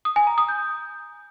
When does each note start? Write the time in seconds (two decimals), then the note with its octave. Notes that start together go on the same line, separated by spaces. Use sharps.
0.05 D#6
0.16 G#5
0.27 A#5
0.38 D#6
0.49 G6